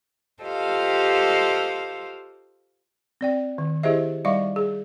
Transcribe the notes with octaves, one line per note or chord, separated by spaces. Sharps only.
F4 G4 A4 C5 D#5 F5
C4 D5 G5
D#3
E4 G4 G#4 C5 D#5 E5
G3 D#4 D5 E5 F5 C#6
G#4